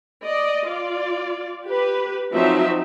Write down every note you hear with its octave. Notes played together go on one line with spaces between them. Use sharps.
D5 D#5
F4 D5
G4 B4
F3 F#3 C4 D#4 E5